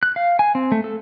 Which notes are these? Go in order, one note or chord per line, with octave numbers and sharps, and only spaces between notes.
F#6
F5
G#5
C4
A3
A4